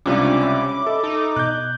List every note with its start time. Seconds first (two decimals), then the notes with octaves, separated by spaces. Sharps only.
0.06 C#2 C3 G3 C#4 D4 F4 F5 D6
0.41 E5 B5
0.87 A4 D#5
1.04 D#4 A4
1.36 B2 F#6 G6